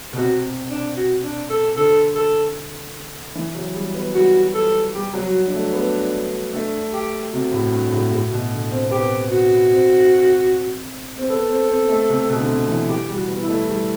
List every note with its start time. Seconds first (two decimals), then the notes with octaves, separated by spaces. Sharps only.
0.13 B2
0.18 C3 F#4
0.70 D4
0.97 F#4
1.24 D4
1.50 A4
1.76 D3 A4
2.15 A4
3.35 E3
3.55 F#3
3.74 G3
3.95 B3
4.14 G3 F#4
4.54 A4
4.94 G3 G4
5.14 F#3
5.21 F#4
5.47 D4
5.53 A3
5.73 B3
6.53 A3 D4
6.93 G4
7.32 C3 F#4
7.52 A2
7.72 G2
7.92 A2
8.11 A2
8.32 B2
8.52 D3
8.71 C4
8.83 C4
8.91 B3 G4
9.31 F#4
9.71 C4
11.18 C4
11.29 B3 A4
11.49 C4
11.69 C4
11.89 A3
12.09 C3
12.29 B2
12.40 D3
12.49 C3
12.69 E3
12.89 E3 G4
13.09 G3
13.15 F#4
13.28 B3
13.42 E4
13.48 A3
13.67 G3 E4